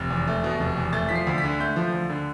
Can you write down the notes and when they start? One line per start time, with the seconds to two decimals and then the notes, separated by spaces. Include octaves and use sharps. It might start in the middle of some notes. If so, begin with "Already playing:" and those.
Already playing: F1
0.10 E2
0.27 A3
0.44 B2
0.60 F1
0.77 E2
0.93 A3 A6
1.09 F3 B6
1.15 C7
1.27 D2
1.38 B6
1.44 D3
1.59 A3 G6
1.76 F3
1.92 D2
2.09 D3